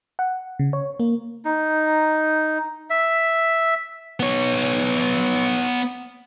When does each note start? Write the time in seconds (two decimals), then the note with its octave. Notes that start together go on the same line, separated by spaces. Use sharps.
0.19 F#5
0.59 C#3
0.73 C#5
1.00 A#3
1.45 D#4
2.90 E5
4.20 B3 C#5